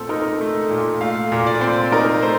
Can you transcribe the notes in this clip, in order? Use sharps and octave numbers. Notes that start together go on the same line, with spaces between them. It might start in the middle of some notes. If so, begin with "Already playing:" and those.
Already playing: A#2 A3 C4 A4
D#4 A#4
A3
A#2
A3 F5
A#2
D5
C4
D#4 A#4
A3 C5